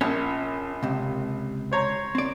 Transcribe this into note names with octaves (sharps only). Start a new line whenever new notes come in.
A#1 C#4
C#2 C3
C5 C#5 A#5
C4 D5